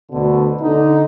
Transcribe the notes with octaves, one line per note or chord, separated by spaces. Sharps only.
D2 B2 D3
D3 D#4